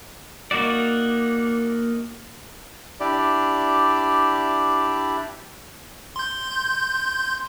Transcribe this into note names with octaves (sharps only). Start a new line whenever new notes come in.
A#3 D#4 F#4 D5
D4 E4 G4 D5
C6 G6